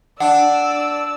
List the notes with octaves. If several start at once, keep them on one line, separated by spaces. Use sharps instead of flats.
D4 D5 F#5 E6